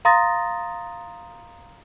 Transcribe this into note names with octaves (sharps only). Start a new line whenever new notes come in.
F5 A#5 C6 D#6 A6 A#6